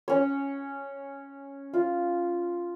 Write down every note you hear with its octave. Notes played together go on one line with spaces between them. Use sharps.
C#4 C#5
F4